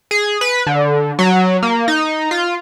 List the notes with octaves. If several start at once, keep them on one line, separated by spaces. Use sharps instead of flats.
G#4
B4
D3
F#3
A#3
D#4
F4